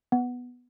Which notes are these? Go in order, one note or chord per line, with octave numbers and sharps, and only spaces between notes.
B3